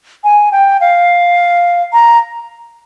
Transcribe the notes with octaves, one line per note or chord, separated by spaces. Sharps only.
G#5
G5
F5
A#5